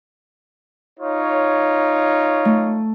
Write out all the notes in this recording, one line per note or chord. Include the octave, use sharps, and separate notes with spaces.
D#4 F4 C#5
A3